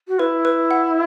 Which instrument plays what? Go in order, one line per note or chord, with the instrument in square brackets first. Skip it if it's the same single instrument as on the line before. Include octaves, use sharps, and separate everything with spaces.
[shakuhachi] F#4
[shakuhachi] E4 [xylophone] B4
[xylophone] B4
F#5